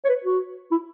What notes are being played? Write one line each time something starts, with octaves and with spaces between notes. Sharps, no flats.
C#5
B4
F#4
E4